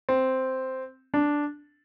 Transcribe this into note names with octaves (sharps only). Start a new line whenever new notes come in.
C4
D4